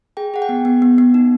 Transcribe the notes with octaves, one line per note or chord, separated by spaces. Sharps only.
G#4 G5
G#4 F#5
G5
B3
B3
B3
B3
D#4